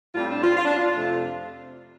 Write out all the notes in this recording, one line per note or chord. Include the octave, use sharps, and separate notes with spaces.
A2 G3 C4 F4
D4
F4
F4
D4
F4
F2 C3 A3